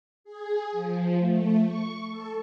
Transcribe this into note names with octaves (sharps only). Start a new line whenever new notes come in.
G#4
F3
A3
C#6
A4